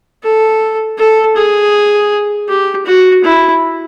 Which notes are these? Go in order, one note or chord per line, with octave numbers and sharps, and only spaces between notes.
A4
A4
G#4
G4
F#4
E4